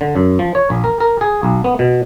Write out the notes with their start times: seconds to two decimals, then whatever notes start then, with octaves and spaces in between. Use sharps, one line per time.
0.01 D3
0.16 F#2
0.39 F3
0.55 C#5
0.70 A#1
0.84 A#4
1.00 A#4
1.21 G#4
1.43 B1
1.64 B3
1.79 B2